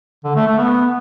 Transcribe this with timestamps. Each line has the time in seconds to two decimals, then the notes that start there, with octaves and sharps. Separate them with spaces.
0.24 D3
0.36 A3
0.47 A3
0.58 B3